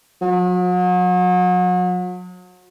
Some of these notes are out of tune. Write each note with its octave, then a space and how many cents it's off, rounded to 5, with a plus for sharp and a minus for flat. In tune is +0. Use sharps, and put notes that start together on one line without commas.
F#3 -40